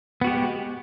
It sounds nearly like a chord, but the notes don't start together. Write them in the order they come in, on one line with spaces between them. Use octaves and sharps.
B3 F#4 G4 G#3